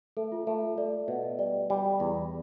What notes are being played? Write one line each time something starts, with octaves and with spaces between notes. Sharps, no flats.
A3 A4
F4
A3 A4
A3 D5
B2
G3 D5
G3
E2